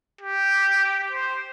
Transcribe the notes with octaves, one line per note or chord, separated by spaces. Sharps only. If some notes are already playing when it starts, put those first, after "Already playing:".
G4
C5